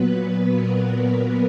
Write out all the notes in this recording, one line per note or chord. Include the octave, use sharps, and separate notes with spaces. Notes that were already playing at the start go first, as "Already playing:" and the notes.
Already playing: A#2 F#3 B3 B4
A#4